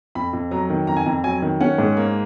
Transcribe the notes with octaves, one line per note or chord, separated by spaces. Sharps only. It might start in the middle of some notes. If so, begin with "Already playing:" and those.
F2 B5
F2
F#3 A#5
D#3
F2 A#5
G#5
F2 A#5
F#3 G#5
D#3
C#4 F#5
G#2
A#3